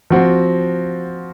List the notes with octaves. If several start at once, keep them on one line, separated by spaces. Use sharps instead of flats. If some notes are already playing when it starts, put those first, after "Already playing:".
F3 C4 F#4